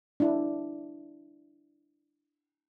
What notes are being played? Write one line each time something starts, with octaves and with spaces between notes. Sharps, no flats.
D4 E4